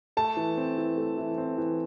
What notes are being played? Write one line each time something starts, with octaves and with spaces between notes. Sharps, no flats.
A3 A5
E3
C4
E3
A3
E3
C4
E3